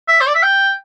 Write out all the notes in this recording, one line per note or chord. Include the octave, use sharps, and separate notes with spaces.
E5
C5
D5
E5
G5